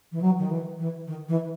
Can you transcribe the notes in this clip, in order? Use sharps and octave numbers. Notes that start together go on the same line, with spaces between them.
E3
F#3
D#3
E3
E3
D#3
E3